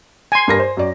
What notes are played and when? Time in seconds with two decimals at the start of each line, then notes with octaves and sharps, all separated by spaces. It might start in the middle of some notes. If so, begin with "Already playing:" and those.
0.32 G#5 C6
0.48 G2 A#4 A#6
0.59 C5
0.77 F#2 D5